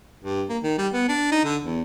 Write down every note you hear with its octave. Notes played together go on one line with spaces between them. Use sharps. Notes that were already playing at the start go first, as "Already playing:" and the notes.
G2
A#3
D#3
G3
B3
D4
D#4
D3
E2